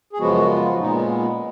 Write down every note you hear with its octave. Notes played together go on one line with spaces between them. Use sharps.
G#4
F#2 C#3 F3 G#3 B3 F#4
F#4
F4
A#2 G#3 B3 D#4
C#4